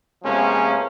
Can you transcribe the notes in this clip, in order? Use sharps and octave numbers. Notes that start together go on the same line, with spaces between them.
C3 F3 G#3 A#3 B3 C#4